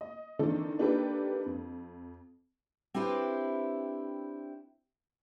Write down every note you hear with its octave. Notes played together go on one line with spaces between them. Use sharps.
D#5
D#3 E3 C4 D4 D#4 A4
A#3 D4 D#4 G4 A4 B4
F2
C4 D4 E4 G4 B4 C5